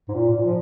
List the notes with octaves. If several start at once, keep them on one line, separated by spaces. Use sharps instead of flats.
G#2
A#2
A#2
F3